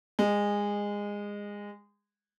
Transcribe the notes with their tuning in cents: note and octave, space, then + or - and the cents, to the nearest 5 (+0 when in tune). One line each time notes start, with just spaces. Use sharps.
G#3 -20